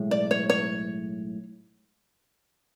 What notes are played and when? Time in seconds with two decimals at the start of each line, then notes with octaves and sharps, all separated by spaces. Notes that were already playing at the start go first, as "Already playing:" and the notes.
Already playing: B1 A2 G#3
0.11 D5
0.31 C#5
0.50 C#5